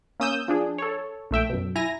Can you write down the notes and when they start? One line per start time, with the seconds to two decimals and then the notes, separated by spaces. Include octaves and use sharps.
0.20 A#3 C#4 D#6 E6 G6
0.48 F3 D4 G#4
0.78 A4 C#5
1.31 A#1 A3 E5 G5
1.50 F#2 B2
1.76 E4 G#5 A#5 A#6